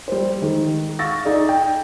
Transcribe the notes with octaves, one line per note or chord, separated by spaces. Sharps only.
G3 C5
D#3 G#3
F5 C#6 E6 A6 A#6
D#4 G#4 D5
G5